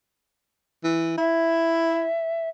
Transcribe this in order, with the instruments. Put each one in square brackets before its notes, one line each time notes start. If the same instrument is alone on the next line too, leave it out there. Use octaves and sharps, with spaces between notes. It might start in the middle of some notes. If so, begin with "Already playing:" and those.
[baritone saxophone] E3
[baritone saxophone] E4 [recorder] E5